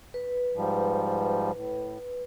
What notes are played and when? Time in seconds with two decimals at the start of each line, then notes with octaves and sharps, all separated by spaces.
0.14 B4
0.56 G#2 F3 G3
1.54 A2